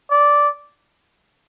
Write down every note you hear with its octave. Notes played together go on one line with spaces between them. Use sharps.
D5